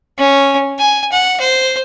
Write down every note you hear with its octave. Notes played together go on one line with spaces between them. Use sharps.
C#4
G#5
F#5
C5